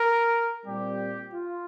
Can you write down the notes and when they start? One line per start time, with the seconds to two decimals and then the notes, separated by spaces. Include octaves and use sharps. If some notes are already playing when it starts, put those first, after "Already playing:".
Already playing: A#4
0.65 A#2 G3 C4 G4
1.33 F4